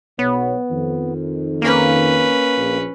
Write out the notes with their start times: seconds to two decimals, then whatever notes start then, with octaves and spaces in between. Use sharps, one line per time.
0.19 B1 B2 B3 C#5
0.70 F2 D#3
1.62 A#3 C#4 B4
2.57 A#1